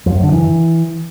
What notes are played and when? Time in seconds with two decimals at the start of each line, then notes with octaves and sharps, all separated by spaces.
0.06 F2
0.15 F#2
0.23 D3
0.32 E3